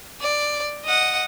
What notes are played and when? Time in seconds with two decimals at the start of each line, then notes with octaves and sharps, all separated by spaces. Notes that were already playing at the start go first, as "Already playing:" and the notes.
0.21 D5
0.85 D#5 F#5